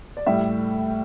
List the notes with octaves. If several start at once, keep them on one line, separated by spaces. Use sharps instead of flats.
D5
A2 G3 E5